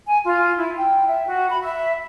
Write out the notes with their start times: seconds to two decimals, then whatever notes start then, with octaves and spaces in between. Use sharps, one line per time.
0.07 G#5
0.24 F4
0.57 E4
0.77 G5
1.07 E5
1.27 F#4
1.50 B5
1.62 E5